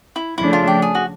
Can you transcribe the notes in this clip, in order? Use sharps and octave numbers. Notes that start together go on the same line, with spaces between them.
E4
C#3 F3 A3 D4 E4
F4
G4
G#4
F#4